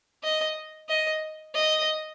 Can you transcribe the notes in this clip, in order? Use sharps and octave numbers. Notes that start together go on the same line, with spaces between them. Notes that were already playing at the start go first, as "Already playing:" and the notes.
D#5
D#5
D#5